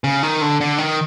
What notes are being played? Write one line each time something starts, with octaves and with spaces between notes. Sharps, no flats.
C#3
D#3
D3
D3
D#3